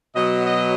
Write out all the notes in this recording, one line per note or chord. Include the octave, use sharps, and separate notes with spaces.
B2 F#3 D#5
D#5